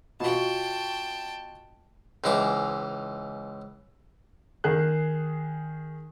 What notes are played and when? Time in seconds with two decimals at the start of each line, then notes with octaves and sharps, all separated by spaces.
0.20 B2 F4 F#4 G5 A5
2.24 C#2 G#2 E3 G#4 D6
4.64 D#3 G#4 F#6